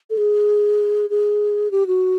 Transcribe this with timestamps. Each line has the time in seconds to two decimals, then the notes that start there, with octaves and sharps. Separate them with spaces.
0.10 A4
0.17 G#4
1.10 G#4
1.71 G4
1.87 F#4